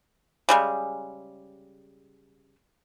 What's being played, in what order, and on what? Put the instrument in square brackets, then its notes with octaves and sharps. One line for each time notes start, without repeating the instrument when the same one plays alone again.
[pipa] C#3 G3 G#3